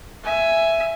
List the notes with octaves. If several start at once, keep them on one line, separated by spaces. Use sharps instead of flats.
E5 G#5